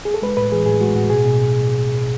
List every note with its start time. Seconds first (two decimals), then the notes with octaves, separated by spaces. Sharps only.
0.05 G#4
0.14 A4
0.22 G#3 B4
0.37 A2 B4
0.52 E3 G#4
0.66 A2 G#4
0.81 G#3 F#4
0.95 A2 F#4
1.10 B2 G#4
1.25 B2